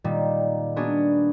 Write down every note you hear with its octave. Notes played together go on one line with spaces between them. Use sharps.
A#2 D#3 G3
A#3 B3 D4 F#4 G#4